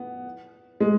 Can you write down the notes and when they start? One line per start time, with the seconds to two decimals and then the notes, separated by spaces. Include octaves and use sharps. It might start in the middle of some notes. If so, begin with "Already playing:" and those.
Already playing: B3
0.80 G#3